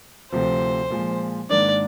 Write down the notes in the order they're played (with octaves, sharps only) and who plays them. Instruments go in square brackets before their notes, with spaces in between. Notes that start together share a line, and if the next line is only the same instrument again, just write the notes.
[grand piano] D2 C3 F3 [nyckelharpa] C5
[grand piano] A#2 F3 G#3
[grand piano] G#2 D#3 A#3 D4 [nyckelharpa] D5